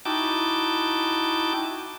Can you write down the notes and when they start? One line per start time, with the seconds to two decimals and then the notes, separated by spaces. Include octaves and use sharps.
0.05 D#4 E4 F#4 G5 A5 D6